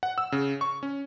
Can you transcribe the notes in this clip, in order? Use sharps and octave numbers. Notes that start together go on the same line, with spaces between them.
F#5
E6
C#3
C#6
C#4